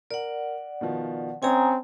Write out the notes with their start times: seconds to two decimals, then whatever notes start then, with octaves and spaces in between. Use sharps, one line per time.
0.11 A#4 D5 F#5
0.81 B2 D#3 F3
1.43 C4 C#4 C#5 D#5 G#5 A#5 D#6